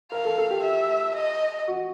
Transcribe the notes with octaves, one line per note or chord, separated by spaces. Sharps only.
A#4 F5
A4
A4
G4
E5
D#5
F#4